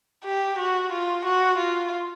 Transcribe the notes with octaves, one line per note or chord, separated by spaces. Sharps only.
G4
F#4
F4
F#4
F4